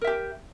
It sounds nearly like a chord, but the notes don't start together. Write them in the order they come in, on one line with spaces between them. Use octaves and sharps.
A#4 E5 G4